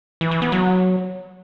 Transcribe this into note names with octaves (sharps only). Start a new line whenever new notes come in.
E3
E3
B3
F#3